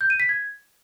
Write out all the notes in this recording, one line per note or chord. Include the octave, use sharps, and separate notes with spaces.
G6
D#7
B6
G#6